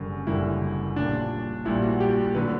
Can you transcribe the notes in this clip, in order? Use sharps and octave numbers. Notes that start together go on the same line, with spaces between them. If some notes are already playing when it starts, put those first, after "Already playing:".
Already playing: F#1 F#2 D3 G3
F#1 F#2 D3 G3 E4
A#1 A#2 G3 D4
A#1 A#2 G3 E4
F#4
G4
D3 F#3 B4